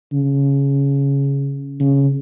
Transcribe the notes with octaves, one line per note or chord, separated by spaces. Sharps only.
C#3
C#3